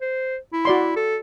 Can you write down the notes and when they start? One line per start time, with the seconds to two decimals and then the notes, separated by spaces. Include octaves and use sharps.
0.01 C5
0.53 E4
0.65 F#4 D5 C6
0.96 A4